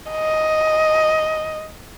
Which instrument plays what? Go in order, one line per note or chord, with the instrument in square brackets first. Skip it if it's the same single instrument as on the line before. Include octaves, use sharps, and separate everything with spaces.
[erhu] D#5